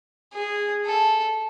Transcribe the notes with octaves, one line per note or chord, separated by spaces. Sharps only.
G#4
A4